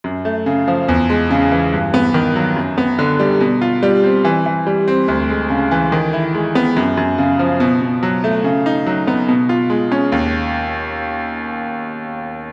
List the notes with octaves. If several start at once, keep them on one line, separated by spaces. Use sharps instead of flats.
F#2
A3
C#3
F3
E2
G#3
C#3
E3
G2
B3
D#3
F#3
F#2
B3
D3
G3
B2
F4
G3
C4
E3
E3
G3
C4
D2
G#3
C#3
E3
D#3
E4
G#3
B3
F#2
F#2
C#3
F3
B2
B2
F#3
A3
C#3
D#4
F#3
B3
B2
F4
G#3
C#4
D#2